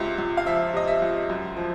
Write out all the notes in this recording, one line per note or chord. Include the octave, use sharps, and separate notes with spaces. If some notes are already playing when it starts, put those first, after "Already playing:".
Already playing: C#2 C3 E5
C#2
F5
F3 E5
C3 D#5
E5
C#2
F#2
F3